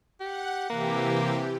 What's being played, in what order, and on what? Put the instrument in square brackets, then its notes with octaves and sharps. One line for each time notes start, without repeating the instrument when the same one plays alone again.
[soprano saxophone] G4 [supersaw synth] F#5
[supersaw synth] C3 E3 G4 [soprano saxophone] A#3